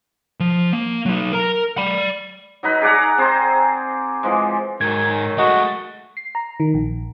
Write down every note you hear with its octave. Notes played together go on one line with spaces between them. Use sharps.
F3
A#3
F#3 D#4
A#4 A#5
D5 B5
F#3 D#4 B4
G#4 D5 F#5 A#5
C4 G#4 C5 A#5
E3 F3 G#3
G#2 D#3 F#3 G#6
G#3 A3 F#4 D#5
C7
A#5
D#3
A#1